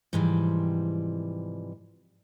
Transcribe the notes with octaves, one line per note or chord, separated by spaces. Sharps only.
G#2 C3 E3 F3 G3